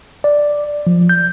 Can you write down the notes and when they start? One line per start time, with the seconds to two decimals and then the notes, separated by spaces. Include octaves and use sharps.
0.24 D5
0.87 F3
1.09 G6